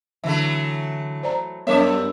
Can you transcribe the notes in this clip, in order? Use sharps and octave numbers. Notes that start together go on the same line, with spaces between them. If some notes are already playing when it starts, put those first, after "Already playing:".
D3 E3 F#3 A3 E5
C5 D5 A#5
F#2 G3 B3 A#4 C#5 E5 D6